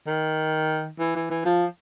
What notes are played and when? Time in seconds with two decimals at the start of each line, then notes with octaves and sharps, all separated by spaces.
0.07 D#3
0.99 E3
1.16 E3
1.30 E3
1.45 F3